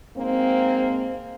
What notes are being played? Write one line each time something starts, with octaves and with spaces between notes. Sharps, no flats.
G#2 A#3 C4